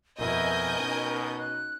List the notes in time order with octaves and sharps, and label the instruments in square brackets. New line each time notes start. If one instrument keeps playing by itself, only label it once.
[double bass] F2 E4 [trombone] B2 [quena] A#4 [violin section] D#5 G#5 G6
[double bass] C#4 D#4
[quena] F#6